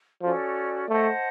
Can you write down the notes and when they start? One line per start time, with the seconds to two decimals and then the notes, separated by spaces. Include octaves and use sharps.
0.22 F3 C#4 F#4 A4 D5
0.89 A3 C5 D#5 F#5 A5